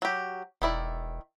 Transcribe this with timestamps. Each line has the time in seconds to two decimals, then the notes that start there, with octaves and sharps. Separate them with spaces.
0.02 F#3 G4
0.62 E1 D#3 E4 D5